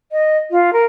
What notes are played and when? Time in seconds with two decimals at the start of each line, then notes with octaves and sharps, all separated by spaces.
0.12 D#5
0.51 F4
0.73 A#4